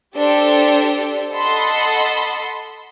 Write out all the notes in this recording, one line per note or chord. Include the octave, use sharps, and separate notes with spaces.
D4 G4 A4 C5
A4 D#5 F#5 A5 B5 C6